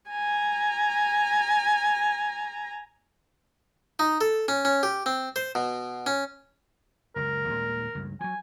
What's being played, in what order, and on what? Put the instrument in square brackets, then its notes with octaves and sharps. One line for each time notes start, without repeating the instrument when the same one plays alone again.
[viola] G#5 A#5
[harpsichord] D#4
A4
C#4
C#4
G4
C4
C5
B2
C#4
[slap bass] F#1 C#2 [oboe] A#4
[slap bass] D#2 A#2 G#3
C#2 G2
[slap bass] F3 F#3 [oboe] G#5